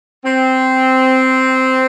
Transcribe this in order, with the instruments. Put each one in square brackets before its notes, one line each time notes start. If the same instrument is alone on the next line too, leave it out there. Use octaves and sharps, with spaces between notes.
[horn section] C4